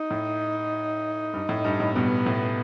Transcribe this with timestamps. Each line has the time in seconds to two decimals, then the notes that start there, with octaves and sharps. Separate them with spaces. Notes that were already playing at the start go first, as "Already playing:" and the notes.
Already playing: D#4
0.10 A2
1.33 G2
1.49 A2
1.64 G2
1.80 A2
1.95 G2 B2 B3
2.26 A2